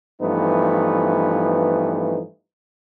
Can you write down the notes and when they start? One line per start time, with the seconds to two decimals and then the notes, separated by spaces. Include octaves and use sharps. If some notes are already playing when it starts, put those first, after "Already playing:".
0.22 G2 E3 F3 A3 B3 D#4